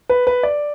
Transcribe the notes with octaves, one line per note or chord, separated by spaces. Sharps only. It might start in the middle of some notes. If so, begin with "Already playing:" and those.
B4
B4
D5